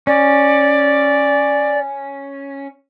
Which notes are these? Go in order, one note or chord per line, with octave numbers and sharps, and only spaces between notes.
C#4 D5